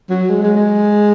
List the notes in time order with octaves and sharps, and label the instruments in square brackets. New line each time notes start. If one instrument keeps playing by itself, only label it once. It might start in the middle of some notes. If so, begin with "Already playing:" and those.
[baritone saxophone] F#3
G#3
G#3
G#3